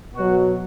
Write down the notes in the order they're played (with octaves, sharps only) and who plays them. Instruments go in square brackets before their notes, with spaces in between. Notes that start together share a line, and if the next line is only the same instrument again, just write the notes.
[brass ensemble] B2 F#3 F#4